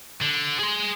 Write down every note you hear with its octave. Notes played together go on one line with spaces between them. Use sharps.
D3
G#4 C6